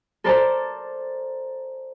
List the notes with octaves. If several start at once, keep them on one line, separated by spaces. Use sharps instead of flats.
A4 A#4 C5 D5 A5